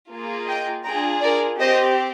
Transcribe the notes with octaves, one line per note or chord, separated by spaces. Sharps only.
A#3 F4 G#4
D#5 G5
D4 F4 G#4 G5 A#5
A#4 D5
C4 G4 C5 D#5